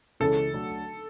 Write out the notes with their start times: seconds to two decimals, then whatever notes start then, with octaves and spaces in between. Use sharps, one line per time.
0.20 C#2 C#3 E3 A4
0.53 D2 D3 F#3 A3 D4